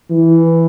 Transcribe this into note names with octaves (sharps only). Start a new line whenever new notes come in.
E3